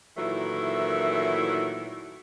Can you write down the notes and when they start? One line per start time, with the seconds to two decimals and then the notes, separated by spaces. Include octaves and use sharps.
0.17 A#2 D#3 E3 F#3 A3 E4